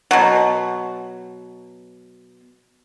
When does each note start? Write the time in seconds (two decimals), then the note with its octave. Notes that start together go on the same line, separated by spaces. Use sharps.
0.11 B2 F#3